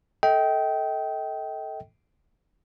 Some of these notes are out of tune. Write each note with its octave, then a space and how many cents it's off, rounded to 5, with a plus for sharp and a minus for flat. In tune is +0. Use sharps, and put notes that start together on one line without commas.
A4 +0 D#5 +35 G5 -15